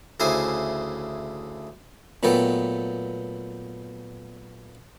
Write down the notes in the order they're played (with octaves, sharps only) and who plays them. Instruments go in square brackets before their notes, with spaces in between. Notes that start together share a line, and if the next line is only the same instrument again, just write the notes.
[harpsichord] D2 C#3 E4 C5 G#5
A#2 F#3 A3 B3 A4 G5